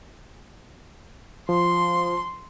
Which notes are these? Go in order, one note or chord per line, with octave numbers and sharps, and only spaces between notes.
F3 C6